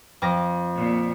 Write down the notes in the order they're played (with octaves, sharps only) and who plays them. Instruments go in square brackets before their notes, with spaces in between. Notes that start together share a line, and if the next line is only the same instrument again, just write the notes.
[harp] F2 D6 A#6
[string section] A#2